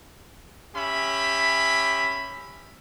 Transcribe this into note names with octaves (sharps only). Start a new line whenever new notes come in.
C#4 G4 E5 B5